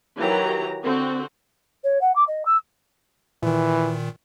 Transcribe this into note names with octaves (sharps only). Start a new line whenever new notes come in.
D#3 E3 F#3 G4 A#5
D3 C4 F#4
C#5
F#5
D6
D#5
E6
A#2 D#3 E3